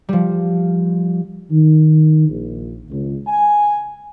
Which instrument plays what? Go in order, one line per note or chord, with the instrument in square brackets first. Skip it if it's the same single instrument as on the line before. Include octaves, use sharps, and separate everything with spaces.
[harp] F3 G3
[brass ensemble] D#3
A#1
C#2
G#5